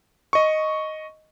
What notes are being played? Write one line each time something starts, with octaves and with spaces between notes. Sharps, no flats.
D#5 C#6